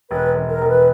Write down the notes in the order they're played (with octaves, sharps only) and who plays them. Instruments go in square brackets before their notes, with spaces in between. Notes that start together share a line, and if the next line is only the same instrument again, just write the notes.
[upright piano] E1 [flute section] B4
[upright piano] E1
[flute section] A#4
[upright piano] E1
[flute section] B4